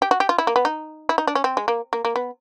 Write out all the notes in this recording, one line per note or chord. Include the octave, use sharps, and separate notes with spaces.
G4
F#4
G4
F4
E4
A#3
B3
D#4
E4
D#4
D4
C#4
C4
G#3
A#3
A#3
A#3
B3